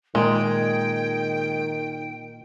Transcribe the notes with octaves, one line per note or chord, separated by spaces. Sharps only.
A#2 D#3 G#3 G5